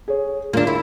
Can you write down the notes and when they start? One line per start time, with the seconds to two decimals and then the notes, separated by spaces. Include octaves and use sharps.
0.08 G#4 C#5
0.53 D3 A#3 D4 F4
0.67 E4